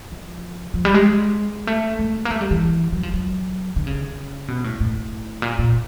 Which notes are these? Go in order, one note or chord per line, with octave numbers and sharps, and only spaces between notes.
F3
F3
G3
G#3
A3
A3
A#3
A3
G3
E3
F#3
F3
F#3
D3
C#3
B2
A2
A2
A#2
A#2